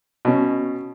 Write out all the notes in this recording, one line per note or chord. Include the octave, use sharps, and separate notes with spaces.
B2 C#4